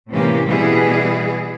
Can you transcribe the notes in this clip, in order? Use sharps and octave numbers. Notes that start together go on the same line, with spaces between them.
A2 C3 E3 A#3 C#4 G4
B2 E3 G3 B3 E4 G#4